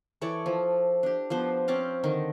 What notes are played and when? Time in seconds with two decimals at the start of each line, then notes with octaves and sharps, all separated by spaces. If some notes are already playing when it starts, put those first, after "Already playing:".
0.21 E3 A4 C#5 D5
0.46 F3
1.03 D4 G4
1.30 F3 B3 C5
1.68 C4 C#4 D5 F5
2.03 D3 D#3